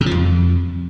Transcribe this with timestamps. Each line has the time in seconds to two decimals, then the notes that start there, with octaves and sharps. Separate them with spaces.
0.01 C3
0.06 F3
0.11 F2